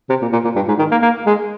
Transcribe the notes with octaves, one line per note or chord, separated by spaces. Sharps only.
C3
A#2
A#2
A#2
G2
G#2
D#3
A#3
A#3
G#3